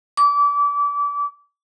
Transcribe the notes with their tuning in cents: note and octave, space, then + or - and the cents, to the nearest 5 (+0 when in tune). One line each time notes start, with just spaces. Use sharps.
D6 -30